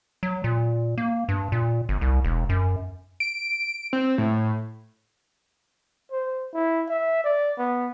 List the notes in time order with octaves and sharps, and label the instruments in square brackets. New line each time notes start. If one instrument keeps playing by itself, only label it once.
[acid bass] F#3
A#2
A#3
G2
A#2
G1
C2
E1
F#2
[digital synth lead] D7
C4
A2
[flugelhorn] C5
E4
E5
D5
B3